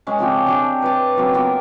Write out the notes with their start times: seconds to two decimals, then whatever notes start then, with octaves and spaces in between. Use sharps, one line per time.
0.07 G#3 C#4 F5
0.19 C#3 F3 C4 G4
0.47 D4 G4 G#4
0.82 B4 C#5 A5
1.17 C#3 F#3 A#3 C4
1.34 A#3 B3 F4 A#4